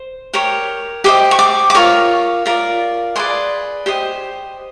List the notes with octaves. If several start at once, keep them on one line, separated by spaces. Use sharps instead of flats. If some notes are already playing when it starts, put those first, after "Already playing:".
Already playing: C5
G4 A#4 C#5
G4 C5 D#5 D6
C#6
D6
D6
F4 A#4 C#5 C#6
F4 A#4 D5
G#4 B4 D5 C6
G4 C5 D#5